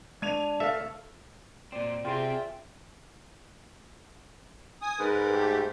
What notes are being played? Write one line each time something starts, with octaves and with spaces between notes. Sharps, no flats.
G#3 D4 G#6 D#7 F7
A3 A4 A#4 D5 E5 F5
A#2 C4 D5
C3 C4 F4 G#4 C5 E5 G5 C6
G#5 D#6
G#2 A#4 B4
A3 G4